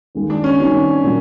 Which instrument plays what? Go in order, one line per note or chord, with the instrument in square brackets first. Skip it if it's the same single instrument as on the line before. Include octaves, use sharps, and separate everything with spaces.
[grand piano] D#2 D#3 G#3
[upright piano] D4
C#4
[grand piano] D#3 G3 C4 D#4 F#4 [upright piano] C#4
[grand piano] A#2 F#3